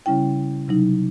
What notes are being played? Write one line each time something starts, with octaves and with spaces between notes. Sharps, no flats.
C#3 G3 C#4 E4 G5
C3 F#3 D#4